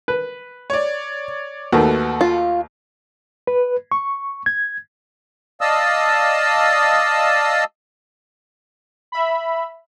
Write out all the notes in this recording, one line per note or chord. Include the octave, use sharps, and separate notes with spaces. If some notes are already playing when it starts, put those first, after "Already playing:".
B4
C#5 D5
D#2 D#3 A3 F#4 A4 B4
F4
B4
C#6
G#6
D5 D#5 F5 A5 D#6 E6
E5 B5